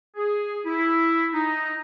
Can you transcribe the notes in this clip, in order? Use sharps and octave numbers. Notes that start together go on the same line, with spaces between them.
G#4
E4
D#4